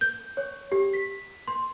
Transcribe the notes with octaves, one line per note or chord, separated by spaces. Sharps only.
G6
C#5
G4
B6
C6